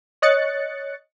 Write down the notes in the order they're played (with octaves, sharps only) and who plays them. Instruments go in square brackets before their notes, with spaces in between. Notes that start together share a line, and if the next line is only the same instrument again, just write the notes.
[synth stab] C#5 D#5 F#6 A6 C#7